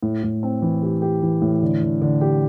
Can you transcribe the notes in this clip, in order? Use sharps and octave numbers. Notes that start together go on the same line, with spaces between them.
A2
A2
C4
E3
G4
G4
E3
A2
D3
D3
D3
G4